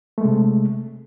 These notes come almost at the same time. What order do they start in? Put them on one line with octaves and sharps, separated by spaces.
A3 G#3 C3